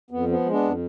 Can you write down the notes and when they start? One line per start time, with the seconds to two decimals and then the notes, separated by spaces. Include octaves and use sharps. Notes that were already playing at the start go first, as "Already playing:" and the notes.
0.11 F2 B3
0.28 F3 B3
0.46 G#3
0.51 B3 D4
0.63 F2